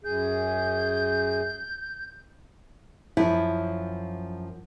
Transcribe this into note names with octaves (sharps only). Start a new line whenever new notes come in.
F#2 G#4 G6
F#2 F3 E4